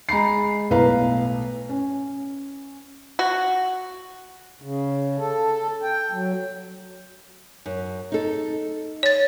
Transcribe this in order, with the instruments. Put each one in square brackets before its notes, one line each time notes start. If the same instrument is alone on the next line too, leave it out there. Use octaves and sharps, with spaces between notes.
[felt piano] G#3 A#5 B5 C7
B1 A2 B4 F5 A#5
C#4
[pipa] F#4
[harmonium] C#3
A4
G5
F#3
[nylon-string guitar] F#2
D#4 A4
[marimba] C#5 A6